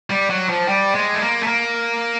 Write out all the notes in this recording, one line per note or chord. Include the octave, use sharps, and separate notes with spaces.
G3
F#3
F3
G3
G#3
A3
A#3
A3
A#3